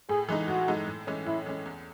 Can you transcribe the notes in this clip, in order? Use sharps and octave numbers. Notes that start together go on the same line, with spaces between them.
A2 G#4
E3 G#3 D#4
A2 F#4
E3 G#3 D#4
A2
E3 G#3 C#4
A2 E4
E3 G#3 C#4
E2